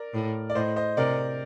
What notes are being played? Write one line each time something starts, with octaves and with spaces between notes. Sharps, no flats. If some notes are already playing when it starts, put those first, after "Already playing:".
Already playing: A#4 D5
A2
D5
A2 C5 D#5
C5 D#5
C3 A#4 D5